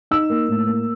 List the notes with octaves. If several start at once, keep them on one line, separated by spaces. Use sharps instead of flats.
D#4 E6
A#3
A2
A#3